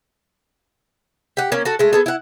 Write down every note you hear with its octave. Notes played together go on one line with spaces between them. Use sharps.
G4 F#5
A#3 C#4
F#4 A4
G#3 A3
B3 G#4 A4
E4 F#5